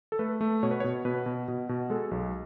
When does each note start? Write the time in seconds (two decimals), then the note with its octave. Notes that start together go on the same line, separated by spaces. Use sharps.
0.12 A4
0.19 A3 B4
0.41 A3
0.63 B2 C#5
0.71 B4
0.80 C#5
0.84 B2
1.05 B2 B4
1.26 B2
1.48 B2
1.69 B2
1.90 G#3 A4
2.11 B1